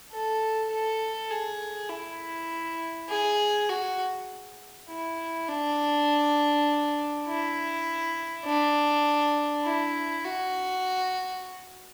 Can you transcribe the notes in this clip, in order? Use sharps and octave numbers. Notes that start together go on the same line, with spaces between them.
A4
A4
G#4
E4
G#4
F#4
E4
D4
E4
D4
E4
F#4